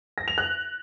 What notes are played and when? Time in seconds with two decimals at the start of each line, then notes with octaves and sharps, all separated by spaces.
0.18 A#6
0.28 F7
0.38 F#6